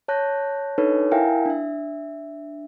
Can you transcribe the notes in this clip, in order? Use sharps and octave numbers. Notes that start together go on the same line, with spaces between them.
C#5 A5 F#6 G6 A#6
D4 D#4 A4 B4 C#5
E4 A#4 E5 F5 G5 G#5
D4 E5